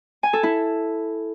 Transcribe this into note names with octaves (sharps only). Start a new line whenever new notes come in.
G#5
A4
E4